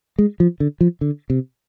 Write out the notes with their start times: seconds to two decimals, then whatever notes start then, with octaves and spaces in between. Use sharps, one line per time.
0.19 G#3
0.40 F3
0.60 D3
0.81 F3
1.01 D3
1.30 C3